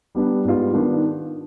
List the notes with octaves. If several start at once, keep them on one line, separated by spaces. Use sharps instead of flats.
G3 B3 D4
G#2 G3 B3 F4
D#3 B3 D4